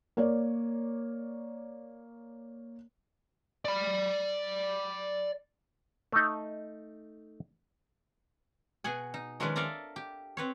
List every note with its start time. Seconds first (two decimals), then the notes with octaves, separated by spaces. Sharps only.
0.17 A#3 C#5 D5
3.65 D5 B5
6.12 A3 D#4
8.84 B2 G#4 F#5 G#5
9.14 D#4
9.40 D#3 F3 G#3 C#4 D4 B4
9.56 A4 A#4 D5 E5 F5 A#5
9.96 G4
10.37 C4 B4 C#5